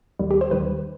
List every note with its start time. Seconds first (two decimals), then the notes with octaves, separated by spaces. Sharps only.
0.19 D#2 D#3 G3
0.31 G4
0.41 C5
0.51 D#2 D#3 G3 B4